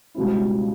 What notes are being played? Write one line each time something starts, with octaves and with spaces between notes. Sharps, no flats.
C#2 B2 G3 C4 E4